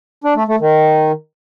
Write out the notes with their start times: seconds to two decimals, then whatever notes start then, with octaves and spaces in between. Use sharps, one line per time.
0.24 D4
0.36 A3
0.48 A3
0.60 D#3